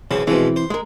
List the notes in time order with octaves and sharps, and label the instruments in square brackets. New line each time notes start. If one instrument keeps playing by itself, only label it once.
[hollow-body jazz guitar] B1 [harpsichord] C#3 E3 C4
[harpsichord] B2 F3 G#3 [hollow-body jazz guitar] E3 C4
[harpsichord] C5
[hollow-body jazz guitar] G#3 A#4